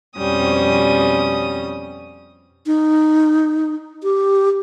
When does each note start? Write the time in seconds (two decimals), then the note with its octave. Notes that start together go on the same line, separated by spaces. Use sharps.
0.18 F2 B2 G3 C#4 D#6
2.66 D#4
4.03 G4